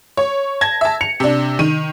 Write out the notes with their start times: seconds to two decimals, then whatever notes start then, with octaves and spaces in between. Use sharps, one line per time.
0.17 C#5
0.61 A5 G#6 A#6
0.81 E5 A5
1.01 C#7 F7
1.20 C3 D4
1.59 D#3 D#7